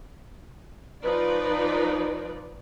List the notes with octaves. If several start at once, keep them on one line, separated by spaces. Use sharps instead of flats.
F3 D#4 B4 D5